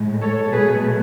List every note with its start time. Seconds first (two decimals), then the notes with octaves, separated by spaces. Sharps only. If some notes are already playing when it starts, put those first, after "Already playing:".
Already playing: A2 G#3
0.21 A4 C#5
0.51 B2 F#3 A3 G#4 B4